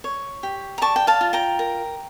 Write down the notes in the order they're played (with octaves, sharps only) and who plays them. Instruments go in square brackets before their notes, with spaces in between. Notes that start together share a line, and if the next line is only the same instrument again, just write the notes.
[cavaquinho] C#5
G4
A#5
D5 A5 C#6
G5
F5 A5
F4
G5 A#5
A#4